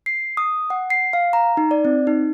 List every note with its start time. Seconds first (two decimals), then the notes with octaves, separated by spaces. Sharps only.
0.06 C7
0.37 D#6
0.70 F#5
0.90 C7
1.13 F5
1.33 A#5
1.57 D#4
1.71 D5
1.85 C4
2.07 D#4